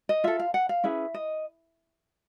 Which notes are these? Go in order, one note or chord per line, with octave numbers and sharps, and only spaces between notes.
D#5
F4 A4 E5
F5
F#5
F5
C#4 E4 G#4 B4 E5
D#5